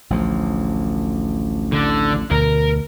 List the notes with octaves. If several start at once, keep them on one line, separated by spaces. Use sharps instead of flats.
A1 D2 F3
D3
D2 B2 A#4